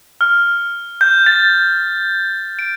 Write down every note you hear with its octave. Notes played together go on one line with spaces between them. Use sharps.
F6
G6
A6
D7